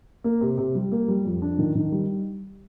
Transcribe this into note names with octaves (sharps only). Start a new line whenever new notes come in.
A#3
C3
C3
G3
A#3
G3
F2
D4
D#3
D#3
G3